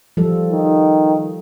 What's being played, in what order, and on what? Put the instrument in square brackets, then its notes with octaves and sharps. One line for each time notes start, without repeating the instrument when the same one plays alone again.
[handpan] F3 G3 A4
[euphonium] D#3